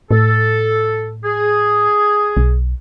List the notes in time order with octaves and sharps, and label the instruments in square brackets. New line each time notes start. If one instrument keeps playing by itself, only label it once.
[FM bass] A2 [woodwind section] A4
[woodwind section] G#4
[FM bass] B1